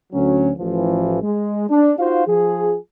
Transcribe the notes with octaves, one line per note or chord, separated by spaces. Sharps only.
D2 F#3 C#4
A1 E3 F3
G#3
D4
D#4 F4 F#4 C5 F5
F3 G#4